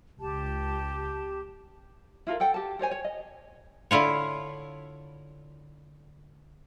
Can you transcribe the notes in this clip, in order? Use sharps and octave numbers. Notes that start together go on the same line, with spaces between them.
C#2 G4 A5
E4 F4 A4 A#4
A4 F#5 G5
G4 A5
A4 C5 C#5 G#5
C#5
D#5
D3 E4 F4 C#5